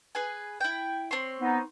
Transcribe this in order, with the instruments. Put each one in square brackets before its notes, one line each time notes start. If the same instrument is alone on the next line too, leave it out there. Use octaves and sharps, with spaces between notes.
[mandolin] G#4 B4 G#5
E4 G5
C4 C#5 C6
[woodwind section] B3 D#4